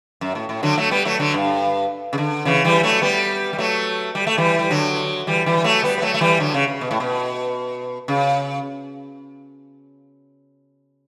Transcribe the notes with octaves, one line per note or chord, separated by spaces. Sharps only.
F#2
A2
A2
D3 F#3
F#3 A3
G3 B3
F#3 A3
D3 F#3
G2
C#3
D3
C#3 E3
E3 G3
F#3 A3
G3 B3
G3
F#3 A3
G3
A3
E3 G3
G3
D3 F#3
E3 G3
E3 G3
G3
F#3 A3
G3 B3
B3
F#3 A3
A3
E3 G3
D3 F#3
C#3
C#3
B2
A2
B2
C#3